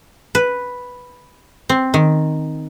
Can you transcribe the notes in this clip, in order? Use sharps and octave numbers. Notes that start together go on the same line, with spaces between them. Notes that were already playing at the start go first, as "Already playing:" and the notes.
B4
C4
D#3